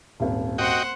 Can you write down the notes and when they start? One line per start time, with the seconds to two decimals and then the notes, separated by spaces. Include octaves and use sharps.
0.20 D#1 G#1
0.58 F#4 C5 D#5 F#5 G5